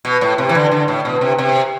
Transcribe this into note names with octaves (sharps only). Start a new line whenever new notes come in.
B2
A2
C3
E3
D3
D3
A2
B2
C3
C3